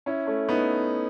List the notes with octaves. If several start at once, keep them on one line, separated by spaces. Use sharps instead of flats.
C#4 E4
A3 C#4
B3 D#4